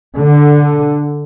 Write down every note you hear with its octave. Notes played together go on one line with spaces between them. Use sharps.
D3